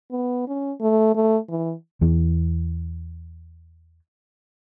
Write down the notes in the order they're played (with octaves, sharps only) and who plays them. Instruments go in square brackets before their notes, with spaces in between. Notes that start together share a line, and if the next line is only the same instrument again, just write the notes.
[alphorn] B3
C#4
A3
A3
E3
[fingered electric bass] E2 E3